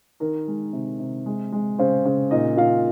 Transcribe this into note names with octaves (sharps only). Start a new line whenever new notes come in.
D#3 A#4
G#3
C3
C3
G#3
G#3
C#3 C4 C5
C#3
A#2 D#4 D#5
A#2 F4 F5